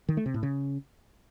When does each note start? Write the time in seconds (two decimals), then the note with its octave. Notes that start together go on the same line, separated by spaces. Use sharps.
0.09 D#3
0.17 A3
0.26 C3
0.34 A2
0.43 C#3